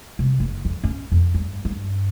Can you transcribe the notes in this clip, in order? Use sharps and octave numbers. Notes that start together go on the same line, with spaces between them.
C2
F#1
F2
C#4
F2
G2
G2